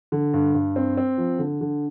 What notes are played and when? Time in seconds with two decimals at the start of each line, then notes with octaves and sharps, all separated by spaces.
0.12 D3
0.34 G2
0.54 G2
0.76 C4
0.97 C4
1.18 F3
1.39 D3
1.61 D3